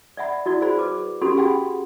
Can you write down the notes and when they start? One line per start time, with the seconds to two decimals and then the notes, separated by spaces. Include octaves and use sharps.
0.17 D5 E5 F#5 B5
0.46 E4 F#4 D5
0.62 G#4 C5 B5
0.78 B4 D6
1.21 C#4 F#4 G4 A4 B5 C6
1.37 G#4 F#5 G5 B5